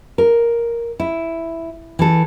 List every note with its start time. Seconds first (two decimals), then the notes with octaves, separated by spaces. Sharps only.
0.18 A#4
1.00 E4
1.99 E3 A4